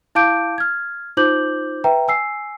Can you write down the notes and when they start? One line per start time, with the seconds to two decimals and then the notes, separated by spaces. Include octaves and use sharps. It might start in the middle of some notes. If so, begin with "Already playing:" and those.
0.15 E4 F5 A5 D6 G6 D7
0.58 F6 G#6
1.17 D#4 F4 C5 D6 G6 F#7
1.84 B4 E5 G5 A#5
2.08 G#5 E6 C7